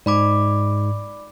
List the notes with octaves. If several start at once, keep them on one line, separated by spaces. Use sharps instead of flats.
G#2 D5 B5 D6